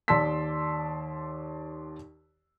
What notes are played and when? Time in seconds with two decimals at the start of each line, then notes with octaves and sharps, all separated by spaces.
0.08 D#2 D5 A5 C6 E6 B6